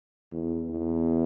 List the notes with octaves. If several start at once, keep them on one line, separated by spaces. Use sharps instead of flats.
E2
E2